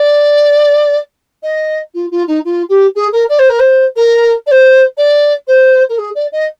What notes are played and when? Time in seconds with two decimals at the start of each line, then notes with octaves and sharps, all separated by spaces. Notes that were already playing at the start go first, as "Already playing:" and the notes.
Already playing: D5
1.43 D#5
1.94 F4
2.11 F4
2.27 D#4
2.45 F4
2.69 G4
2.95 G#4
3.12 A#4
3.29 D5
3.39 C5
3.49 A#4
3.59 C5
3.96 A#4
4.47 D5
4.51 C5
4.97 D5
5.48 C5
5.89 A#4
5.98 G#4
6.15 D5
6.32 D#5